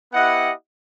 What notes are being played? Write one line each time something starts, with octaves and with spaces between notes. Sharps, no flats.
B3 E4 G4 D#5 F#5